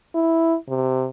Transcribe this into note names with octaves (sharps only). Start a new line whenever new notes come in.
E4
C3